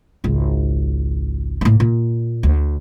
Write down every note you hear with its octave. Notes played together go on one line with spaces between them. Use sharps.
G#1 C#2
A2 A#3
A#2
D2